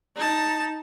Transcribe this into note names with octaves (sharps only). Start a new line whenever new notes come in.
D#4 A5